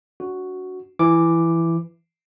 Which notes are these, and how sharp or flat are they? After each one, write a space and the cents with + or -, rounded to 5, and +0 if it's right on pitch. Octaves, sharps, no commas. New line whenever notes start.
D4 -30 F#4 +0
E3 +10 D6 +0